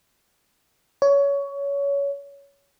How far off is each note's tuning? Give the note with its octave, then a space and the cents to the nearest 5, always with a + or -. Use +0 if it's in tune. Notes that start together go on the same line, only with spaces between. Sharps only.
C#5 +20